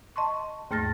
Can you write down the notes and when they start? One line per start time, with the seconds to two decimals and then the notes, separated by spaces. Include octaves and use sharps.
0.16 D#5 A5 C6 C#6
0.71 D#2 G#2 A3 F6 A6 A#6